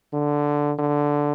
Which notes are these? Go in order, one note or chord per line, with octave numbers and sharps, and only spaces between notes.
D3
D3